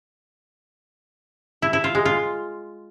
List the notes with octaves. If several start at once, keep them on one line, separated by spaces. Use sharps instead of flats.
E4
E4
F4
G#3
F4